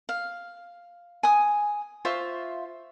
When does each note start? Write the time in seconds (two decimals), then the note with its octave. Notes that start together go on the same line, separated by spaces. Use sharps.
0.09 F5
1.23 G#5 D#6
2.05 F4 C5 E5 C#6